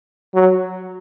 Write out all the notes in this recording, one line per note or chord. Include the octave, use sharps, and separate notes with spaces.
F#3